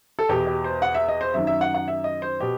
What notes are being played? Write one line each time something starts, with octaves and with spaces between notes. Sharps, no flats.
A4
E2 B2 G4
G4
C5
F#5
E5
D#5
C5
F#2 D#3 E5
E5
F#5
F#5
E5
D#5
C5
B2 G4